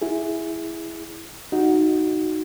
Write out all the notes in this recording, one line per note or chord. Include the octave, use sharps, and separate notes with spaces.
E4 G#4
D#4 F#4